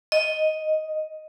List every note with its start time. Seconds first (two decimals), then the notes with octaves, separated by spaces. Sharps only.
0.12 D#5